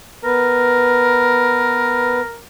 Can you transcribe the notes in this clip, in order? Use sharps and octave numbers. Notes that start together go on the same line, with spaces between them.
B3 A#4 B4